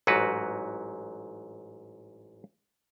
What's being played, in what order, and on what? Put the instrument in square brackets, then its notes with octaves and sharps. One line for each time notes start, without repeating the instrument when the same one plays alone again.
[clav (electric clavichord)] A1 G#2 F#3 F#4 B4